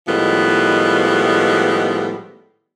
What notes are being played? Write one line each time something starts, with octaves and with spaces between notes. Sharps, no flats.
A2 D#3 F3 G3 G#3 B3